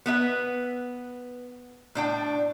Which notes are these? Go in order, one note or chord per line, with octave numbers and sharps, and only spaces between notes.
B3 B4 E5
A2 D4 G5